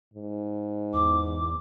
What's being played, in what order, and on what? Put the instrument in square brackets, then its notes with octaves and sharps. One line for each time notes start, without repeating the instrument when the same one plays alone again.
[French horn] G#2
[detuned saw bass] E2 [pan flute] D6